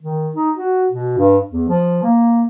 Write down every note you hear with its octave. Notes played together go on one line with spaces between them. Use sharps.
D#3
D#4
F#4
B2
G2
E2
F3
A#3